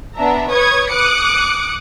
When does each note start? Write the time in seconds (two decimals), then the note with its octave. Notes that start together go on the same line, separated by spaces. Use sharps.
0.16 B3 D4 E5 A#5
0.50 B4 C#5 C#6 D#6 G#6
0.92 D6 D#6 F#6 C#7